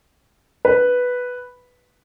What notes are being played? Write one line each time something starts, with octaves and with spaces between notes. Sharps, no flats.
B4